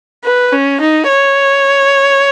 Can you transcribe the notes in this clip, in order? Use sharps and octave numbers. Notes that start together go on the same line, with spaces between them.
B4
C#4
D#4
C#5